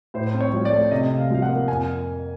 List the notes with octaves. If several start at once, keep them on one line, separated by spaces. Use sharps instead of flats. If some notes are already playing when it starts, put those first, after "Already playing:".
A2 C5
C4
C#5
F3
D5
A3
C3 D#5
C3
F5
F3 F5
F#5
A#3
F2 G#5